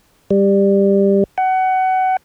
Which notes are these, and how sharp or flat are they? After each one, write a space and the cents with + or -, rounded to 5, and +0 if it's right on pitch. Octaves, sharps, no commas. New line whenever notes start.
G3 +15
F#5 +25